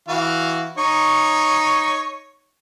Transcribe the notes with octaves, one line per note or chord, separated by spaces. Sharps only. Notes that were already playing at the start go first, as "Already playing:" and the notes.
E3 F#4 F5
D#4 C#5 C#6